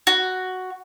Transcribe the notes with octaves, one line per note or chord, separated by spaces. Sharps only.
F#4